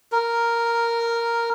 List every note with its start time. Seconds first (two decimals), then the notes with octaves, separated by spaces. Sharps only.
0.12 A#4